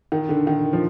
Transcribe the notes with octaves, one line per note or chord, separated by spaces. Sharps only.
D#3
D3
D#3
F3